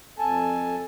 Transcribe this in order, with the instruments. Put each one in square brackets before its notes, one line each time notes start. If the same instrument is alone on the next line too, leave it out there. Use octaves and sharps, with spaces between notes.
[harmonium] F2 A4 G#5 A5